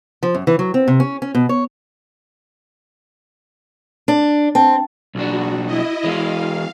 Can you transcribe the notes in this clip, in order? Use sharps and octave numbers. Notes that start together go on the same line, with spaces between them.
F3
F#2
E3
F#3
C4
C3
C#4
C#4
B2
C#5
D4
C4 A5
B1 D4 F#4
E4 D#5
E3 G#3 F5